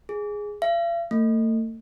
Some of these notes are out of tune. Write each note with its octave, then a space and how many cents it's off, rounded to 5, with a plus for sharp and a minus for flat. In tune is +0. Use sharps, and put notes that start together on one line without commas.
G#4 +0
F5 -45
A3 +35